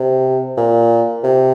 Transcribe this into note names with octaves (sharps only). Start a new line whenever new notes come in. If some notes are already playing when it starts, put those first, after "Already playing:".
Already playing: C3
A#2
C3